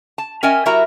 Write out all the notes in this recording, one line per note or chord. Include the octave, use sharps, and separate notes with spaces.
A5
C#4 A#4 D#5 E5 G5 G#5
G3 E4 F#4 A#4 E5 A#5